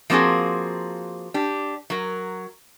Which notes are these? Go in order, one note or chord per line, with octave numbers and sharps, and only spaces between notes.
F3 A#3 C4 F#4 G#4
D4 G4
F#3 A#4